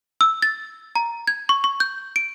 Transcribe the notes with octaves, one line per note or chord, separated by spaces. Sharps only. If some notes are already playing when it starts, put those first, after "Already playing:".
E6
A6
A#5
G#6
C#6
C#6
G6
D7